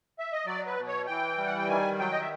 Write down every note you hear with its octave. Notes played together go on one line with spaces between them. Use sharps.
E5
D#5
F#3 D5
B4
B2
C#5
E3 G5
G3
F#5
G5
D#3 G#5
F#3 G5
D#5
E5